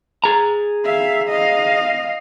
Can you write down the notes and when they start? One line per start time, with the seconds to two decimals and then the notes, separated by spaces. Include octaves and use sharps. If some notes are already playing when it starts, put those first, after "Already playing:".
0.24 G#4 A#5
0.85 E5 F5
1.29 D#5 F5